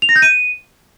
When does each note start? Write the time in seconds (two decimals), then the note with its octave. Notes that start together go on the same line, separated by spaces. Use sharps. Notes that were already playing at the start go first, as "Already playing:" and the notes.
0.02 F7
0.09 A#6
0.16 G6
0.22 D#7